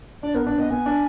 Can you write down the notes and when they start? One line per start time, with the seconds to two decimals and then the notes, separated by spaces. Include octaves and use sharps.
0.22 D4 D5
0.34 B3 A#4
0.47 D4 B4
0.58 B3 D#5
0.70 B3 G#5
0.86 D4